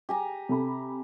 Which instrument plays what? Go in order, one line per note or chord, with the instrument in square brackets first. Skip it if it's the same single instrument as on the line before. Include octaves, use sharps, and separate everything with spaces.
[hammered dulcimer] G4 G#5 A#5
[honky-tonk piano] C3 A4 B5